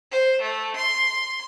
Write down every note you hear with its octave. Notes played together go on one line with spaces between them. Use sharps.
C5
A3
C6